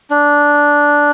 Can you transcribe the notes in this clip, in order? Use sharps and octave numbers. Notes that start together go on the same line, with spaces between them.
D4